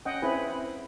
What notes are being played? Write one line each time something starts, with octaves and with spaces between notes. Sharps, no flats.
C#4 D#5 F#5 G5
C4 E4 G#4 B4 G#5